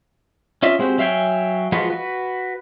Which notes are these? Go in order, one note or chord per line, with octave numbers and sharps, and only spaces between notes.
C#4 F4 D#5 E5
G#3 C4 F#4 G4
F#3 E5 F5 G5 G#5
F3 G#3 F4 F#4 B4
F#4 B4